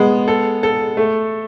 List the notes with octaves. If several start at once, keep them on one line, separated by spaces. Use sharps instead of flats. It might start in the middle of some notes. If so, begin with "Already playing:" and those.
Already playing: G#3 B3
A4
A4
A3